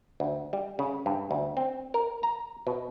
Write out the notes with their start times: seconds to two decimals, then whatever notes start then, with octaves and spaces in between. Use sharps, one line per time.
0.20 D2
0.53 G3
0.79 C#3
1.06 G2
1.31 D2
1.57 C4
1.94 A#4
2.23 A#5
2.67 B2